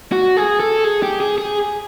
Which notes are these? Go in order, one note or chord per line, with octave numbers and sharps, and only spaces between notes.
F#4
G#4
A4
G#4
G4
G#4
G#4